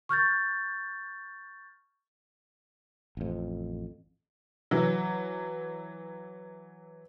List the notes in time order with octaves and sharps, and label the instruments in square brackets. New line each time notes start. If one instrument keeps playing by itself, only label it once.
[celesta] C#6 F6 G6 A6
[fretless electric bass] A1 F2
[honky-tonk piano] E3 F#3